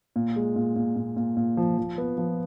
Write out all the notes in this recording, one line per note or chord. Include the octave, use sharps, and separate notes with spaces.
A#2
G#3
A#2
A#2
A#2
A#2
A#2
F3
F3
B3
F3